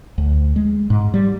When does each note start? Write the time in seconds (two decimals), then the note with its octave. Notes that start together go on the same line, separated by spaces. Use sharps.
0.18 D2
0.56 G#3
0.90 G#2
1.14 G3